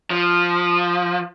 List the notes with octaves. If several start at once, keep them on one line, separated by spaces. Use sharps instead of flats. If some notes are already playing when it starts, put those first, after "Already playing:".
F3